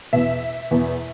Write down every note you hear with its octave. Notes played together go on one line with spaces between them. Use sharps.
E2 B2 E5
E2 B2